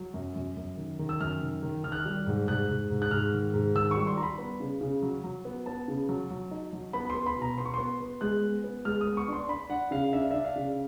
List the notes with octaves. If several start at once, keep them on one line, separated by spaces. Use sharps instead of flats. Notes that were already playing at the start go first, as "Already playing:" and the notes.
Already playing: F#3
F#2
F#2
F#2
D#3
D#3
E6
F#2 F6
D#3
D#3
D#3 F6
F#6
F6
G3
G#2
G#2 F#6
G#2
G#2
F#6
G#2 F6
D#3
G#2
D#3 E6
C#6
G3
C6
G3 A#5
B5
B3
C#3
C#3
F#3
F#3
B3
B3 A5
C#3
F#3
F#3
D#4
F#3
B3 B5
B5
C6
B3
B5
B2
A#5
B3 C6
C#6
B3 C6
B3
G#3 F#6
B3
B3
G#3 F6
D#6
B3
C#6
D4 C6
D4 B5
D4 F#5
C#3 F5
D4 E5
F5
D4 E5
F5
C#3